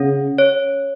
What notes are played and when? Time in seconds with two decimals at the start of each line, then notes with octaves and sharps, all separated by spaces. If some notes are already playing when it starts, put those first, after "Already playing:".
Already playing: C#3 C#4 C#5
0.38 C#5